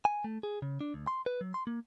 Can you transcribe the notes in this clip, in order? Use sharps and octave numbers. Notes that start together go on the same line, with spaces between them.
G#5
A3
G#4
C#3
D4
D2
C6
B4
F#3
C6
A#3